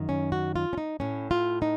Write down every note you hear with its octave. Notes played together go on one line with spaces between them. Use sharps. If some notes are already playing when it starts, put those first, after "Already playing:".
Already playing: F#2 D#3
C#4
F#4
F4
C#4
D#4
A2 C#4
F4
D#4